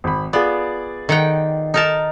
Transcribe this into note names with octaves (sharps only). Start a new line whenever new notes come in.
G#1 B5
B3 F4 G#4 D5
D#3 F#5 G5
D#4 A#4 A5